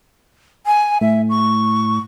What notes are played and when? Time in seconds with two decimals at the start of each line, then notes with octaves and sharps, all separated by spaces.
0.66 G#5
1.01 A2 E5
1.30 C#6